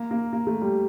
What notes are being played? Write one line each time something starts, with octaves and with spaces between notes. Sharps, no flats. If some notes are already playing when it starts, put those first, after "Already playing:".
Already playing: A#3
A#3
A#3
A3
G3